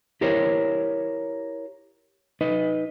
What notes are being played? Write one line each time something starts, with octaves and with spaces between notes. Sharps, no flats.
E4 G4 A#4 C5 C#5
D#4 B4 D#5